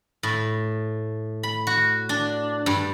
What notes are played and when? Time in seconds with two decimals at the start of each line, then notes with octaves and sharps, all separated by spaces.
0.23 A2
1.43 B5
1.67 F#4
2.09 D4
2.66 G2